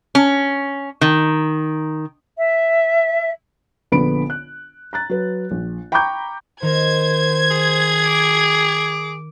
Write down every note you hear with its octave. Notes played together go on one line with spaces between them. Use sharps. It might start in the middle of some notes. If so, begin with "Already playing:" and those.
C#4
D#3
E5
A#1 D3 B3 B4 B5 D7
F#6
A#5 F#6 A6
F#3 B4
A#1
G5 A#5 B5 C#6 D6 G6
D#3 A#4 C5 G#6
G#4
D6